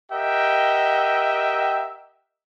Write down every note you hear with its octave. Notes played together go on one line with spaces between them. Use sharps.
G4 A#4 D#5 E5 F#5 G5